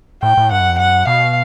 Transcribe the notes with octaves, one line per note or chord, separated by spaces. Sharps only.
A2 G5
A2
G2 F#5
F#2
F2
F#2 F#5
B2 F5